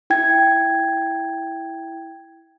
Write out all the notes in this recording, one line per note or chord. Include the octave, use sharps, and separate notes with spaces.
E4 G5 G#6